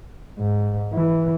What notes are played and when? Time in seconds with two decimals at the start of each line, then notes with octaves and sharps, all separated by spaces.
0.39 G#2
0.94 E3